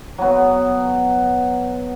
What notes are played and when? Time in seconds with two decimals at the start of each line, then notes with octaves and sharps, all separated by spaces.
0.18 F#3 B3